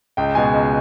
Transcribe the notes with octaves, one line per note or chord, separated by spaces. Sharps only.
C#2 G5
B2 G#3 G#5
C#2